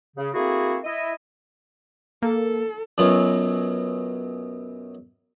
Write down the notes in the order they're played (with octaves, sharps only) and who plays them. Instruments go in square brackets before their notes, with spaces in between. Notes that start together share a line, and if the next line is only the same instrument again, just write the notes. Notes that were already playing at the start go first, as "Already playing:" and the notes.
[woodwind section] C#3
A3 A#3 C4 E4 F#4 G#4
E4 D#5
[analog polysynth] A#3 [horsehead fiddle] A4
[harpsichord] F#2 B2 F#3 B3 C#4 F4